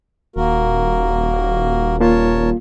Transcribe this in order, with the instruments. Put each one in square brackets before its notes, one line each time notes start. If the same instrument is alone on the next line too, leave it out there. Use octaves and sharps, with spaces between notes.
[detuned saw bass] D#1 [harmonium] A#3 F#4 A#4
[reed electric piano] A#3 F4 [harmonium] A#4 C#5 A5